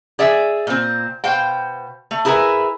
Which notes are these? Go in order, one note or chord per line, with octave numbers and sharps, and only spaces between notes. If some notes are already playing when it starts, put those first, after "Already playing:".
G#4 D5 E5
A#2 C4
B2 C5 F5 G5
A3
E4 G#4 A#4 B4 E5